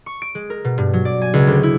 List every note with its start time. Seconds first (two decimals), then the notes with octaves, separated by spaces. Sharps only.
0.06 C#6
0.22 D7
0.35 G#3
0.50 A#4
0.65 B2
0.78 G2
0.93 F#3
1.05 D5
1.22 G#5
1.34 C#2
1.47 D2
1.63 E4